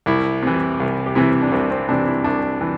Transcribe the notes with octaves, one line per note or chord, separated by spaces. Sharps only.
C2 E4
C3 E3
C2
G4
C3 E3 E4
D4
C2 C4
C4
C3 E3 D4
E4
C2 D4
E3